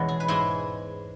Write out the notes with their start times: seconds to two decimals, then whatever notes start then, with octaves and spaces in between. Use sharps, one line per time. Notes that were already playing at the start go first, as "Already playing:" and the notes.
Already playing: E2 B2 G#3 C#4 F#4
0.08 G#4
0.20 B4
0.28 G#2 G#3 E4 G#4